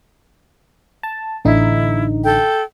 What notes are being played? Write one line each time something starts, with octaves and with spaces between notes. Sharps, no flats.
A5
A1 D3 D#4 E4
A4 G5